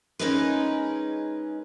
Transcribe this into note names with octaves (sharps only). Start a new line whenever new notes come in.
G#3 C#4 D#4 G#4 A#4 B4